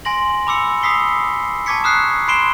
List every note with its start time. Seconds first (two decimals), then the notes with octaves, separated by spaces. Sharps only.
0.05 G#5 C6 A#6 F#7
0.47 B5 D6 E6 C#7
0.83 B5 D#6 E6 B6 C7 G7
1.66 A5 C#6 D6 G#6 B6 C#7
1.84 A#5 D#6 F6 F#6 C7
2.28 B5 C6 C7 D7 E7 G7